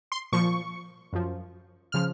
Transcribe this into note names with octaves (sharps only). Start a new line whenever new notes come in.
C6
A#2 F3 C#6
F#2 F3
C#3 F3 F6